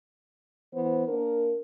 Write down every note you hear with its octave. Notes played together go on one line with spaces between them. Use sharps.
E3 B3 C5
A#3 D4 A#4